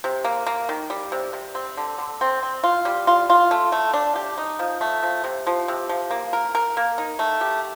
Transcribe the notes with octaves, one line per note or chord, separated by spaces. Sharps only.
C3
A#3
A#3
D#3
G3
C3
C3
C4
D3
D3
C4
C4
F4
G3
F4
F4
A3
A3
D4
G4
D#4
F3
A3
F3
C3
F3
C3
F3
A#3
A#4
A#4
A#3
D#4
A3
G4